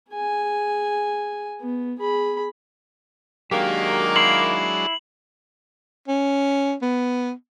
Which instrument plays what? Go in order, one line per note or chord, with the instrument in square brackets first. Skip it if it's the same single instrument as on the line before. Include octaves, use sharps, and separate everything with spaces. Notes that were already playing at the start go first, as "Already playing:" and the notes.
[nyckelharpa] G#4 G#5
B3
G#4 B5
[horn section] D#3 A#3 [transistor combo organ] F#3 G#3 D4 [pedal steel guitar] G4
[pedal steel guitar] E4 C6 [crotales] F#7
[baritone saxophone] C#4
B3